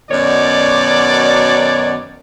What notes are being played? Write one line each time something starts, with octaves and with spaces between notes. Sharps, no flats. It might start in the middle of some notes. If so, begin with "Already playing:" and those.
F#2 B2 D#3 C#5 D5